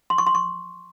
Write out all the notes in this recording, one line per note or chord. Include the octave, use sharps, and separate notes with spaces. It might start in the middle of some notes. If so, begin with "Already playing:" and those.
C6
C#6
C6
C#6